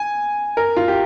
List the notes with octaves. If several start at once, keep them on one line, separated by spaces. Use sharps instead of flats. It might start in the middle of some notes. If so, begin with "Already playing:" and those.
Already playing: G#5
A#4
F4
G4